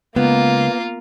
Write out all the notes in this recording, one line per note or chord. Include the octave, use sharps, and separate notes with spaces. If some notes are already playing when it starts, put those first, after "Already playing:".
C#2 A#3 B3 F4